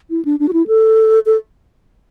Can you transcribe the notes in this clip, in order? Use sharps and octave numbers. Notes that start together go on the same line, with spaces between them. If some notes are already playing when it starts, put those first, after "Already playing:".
E4
D4
D4
F#4
E4
A4
A4